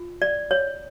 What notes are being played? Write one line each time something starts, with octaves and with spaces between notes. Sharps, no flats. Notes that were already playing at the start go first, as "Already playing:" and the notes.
Already playing: F4
D5
C#5